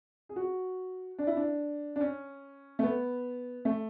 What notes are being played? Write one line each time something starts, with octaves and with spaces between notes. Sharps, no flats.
G#4
F#4
D4
E4
D4
D4
C#4
A3
B3
A3